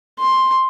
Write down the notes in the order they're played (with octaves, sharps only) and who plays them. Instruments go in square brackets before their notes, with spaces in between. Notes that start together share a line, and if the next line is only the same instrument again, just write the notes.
[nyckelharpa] C6